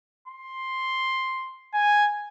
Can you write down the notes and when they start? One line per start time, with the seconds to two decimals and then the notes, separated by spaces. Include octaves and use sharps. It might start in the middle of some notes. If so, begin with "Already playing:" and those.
0.28 C6
1.74 G#5